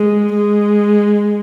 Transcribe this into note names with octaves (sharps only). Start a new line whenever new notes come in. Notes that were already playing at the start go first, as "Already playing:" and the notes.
Already playing: G#3
G#3